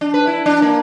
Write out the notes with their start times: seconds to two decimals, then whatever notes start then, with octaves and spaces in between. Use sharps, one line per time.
0.01 D4
0.14 B4
0.27 E4
0.46 D4
0.62 A#3